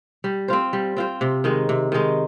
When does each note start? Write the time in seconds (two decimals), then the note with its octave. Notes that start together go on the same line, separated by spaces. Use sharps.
0.24 G3
0.48 C4 F4 C5
0.73 G3
0.97 C4 F4 C5
1.21 C3
1.44 D#3 G#3 D#4
1.69 C3
1.92 D#3 G#3 D#4